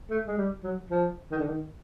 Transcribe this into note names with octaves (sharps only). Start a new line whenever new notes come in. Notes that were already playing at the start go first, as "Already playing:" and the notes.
A3
G#3
G3
F#3
F3
D#3
D3
D#3